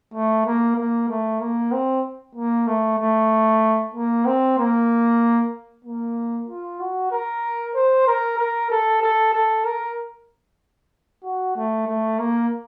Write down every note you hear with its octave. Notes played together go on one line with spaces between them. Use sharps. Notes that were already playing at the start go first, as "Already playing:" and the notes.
A3
A#3
A#3
A3
A#3
C4
A#3
A3
A3
A#3
C4
A#3
A#3
F4
F#4
A#4
C5
A#4
A#4
A4
A4
A4
A#4
F#4
A3
A3
A#3